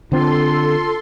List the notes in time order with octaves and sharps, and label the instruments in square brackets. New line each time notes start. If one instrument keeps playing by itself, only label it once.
[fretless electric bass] D3 C4 [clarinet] F4 [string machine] A4 C6